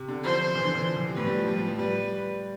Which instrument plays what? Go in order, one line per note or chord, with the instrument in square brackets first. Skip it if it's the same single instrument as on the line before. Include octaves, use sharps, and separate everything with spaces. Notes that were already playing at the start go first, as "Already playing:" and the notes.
Already playing: [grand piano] C3
D3
[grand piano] F3 [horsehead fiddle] C5
[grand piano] E3
D3
E3
F3
E3
C3
[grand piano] A2 [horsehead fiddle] B4
[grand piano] G3
F3
G3
F3
F3
[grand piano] G3 [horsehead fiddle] B4